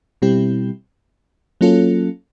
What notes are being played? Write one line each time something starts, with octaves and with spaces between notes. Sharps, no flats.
B2 G3 C4 E4 G4
F#3 A#3 C#4 F4 A4